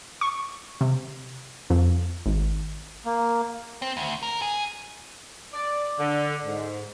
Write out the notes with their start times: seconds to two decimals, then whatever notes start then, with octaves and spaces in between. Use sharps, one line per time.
0.21 C#6
0.81 C3
1.70 F2
2.26 G#1
3.05 A#3
3.82 C4
3.97 D2
4.23 A#4
4.42 G#4
5.54 D5
5.99 D3
6.44 G#2